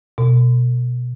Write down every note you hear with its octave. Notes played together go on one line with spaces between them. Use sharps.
B2